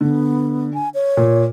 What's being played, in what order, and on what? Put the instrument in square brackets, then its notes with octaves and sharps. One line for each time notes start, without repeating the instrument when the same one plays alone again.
[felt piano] D3 [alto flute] B3
[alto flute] G#5
C#5
[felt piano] A#2